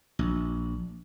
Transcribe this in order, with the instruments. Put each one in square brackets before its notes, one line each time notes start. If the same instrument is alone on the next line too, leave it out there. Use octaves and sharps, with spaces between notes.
[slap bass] A#1